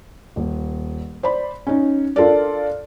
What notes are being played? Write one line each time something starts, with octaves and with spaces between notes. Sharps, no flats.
D#1
C5 D5 B5
C#4 D#4
D4 F4 A4 A#4 D5